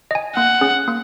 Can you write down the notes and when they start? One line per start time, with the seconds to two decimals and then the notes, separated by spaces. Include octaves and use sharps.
0.11 D#5 G#5
0.36 A#3 F#5
0.61 C#4 G#4
0.88 A#3